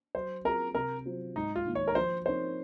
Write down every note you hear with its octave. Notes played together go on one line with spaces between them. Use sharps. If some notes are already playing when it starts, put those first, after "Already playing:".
F#3 C5
C4 F4 G#4 A#4
C3 A#4
F#3 C4 F4 C5
G#2 D#4
F4
D#3 A#3
C#5
A#4
F3 C5
C4 D#4 A#4 C5 C#5